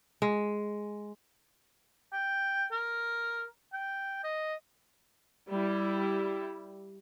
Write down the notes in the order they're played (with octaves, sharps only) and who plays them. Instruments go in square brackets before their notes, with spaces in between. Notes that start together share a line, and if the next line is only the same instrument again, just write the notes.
[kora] G#3
[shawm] G5
A#4
G5
D#5
[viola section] G3 E4